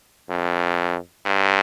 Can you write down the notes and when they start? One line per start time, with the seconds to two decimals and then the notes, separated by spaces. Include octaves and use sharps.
0.30 F2
1.26 G2